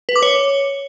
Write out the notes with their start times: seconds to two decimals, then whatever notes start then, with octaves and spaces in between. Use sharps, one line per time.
0.09 B4
0.16 D6
0.23 C#5